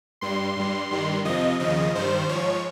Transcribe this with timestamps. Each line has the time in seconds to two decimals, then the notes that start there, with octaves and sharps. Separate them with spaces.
0.21 G2 G3 C6
0.57 G2 G3
0.91 G2 D#3 G3
1.25 F2 C3 F3 D#5
1.60 D#2 C#3 F3 D#5
1.95 G2 D#3 G3 C5
2.29 F3 C#5
2.34 G#2